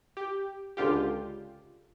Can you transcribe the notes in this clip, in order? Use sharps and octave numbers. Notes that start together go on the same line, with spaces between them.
G4
C#2 D3 F4 G4